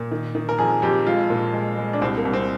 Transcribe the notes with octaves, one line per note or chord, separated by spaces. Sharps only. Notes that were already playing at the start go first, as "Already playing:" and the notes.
Already playing: A#2
D#3
D#3
A#4
F2 G#4
F2 G4
G#3 F4
A#2
G#3
G#3
D4
C2 C4
A#3
C2
C4